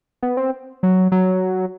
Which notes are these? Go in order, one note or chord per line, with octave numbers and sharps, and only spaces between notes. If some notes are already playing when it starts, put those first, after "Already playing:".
B3
C4
F#3
F#3